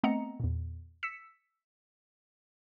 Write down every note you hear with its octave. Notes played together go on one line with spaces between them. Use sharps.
A3 B3 C4 D#5 A#5 C#7
E2 A#2
E6 B6 C#7 E7